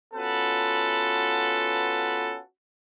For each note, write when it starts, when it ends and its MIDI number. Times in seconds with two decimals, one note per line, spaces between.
0.14 2.38 59
0.14 2.38 61
0.14 2.38 65
0.14 2.38 66
0.14 2.38 69
0.14 2.38 71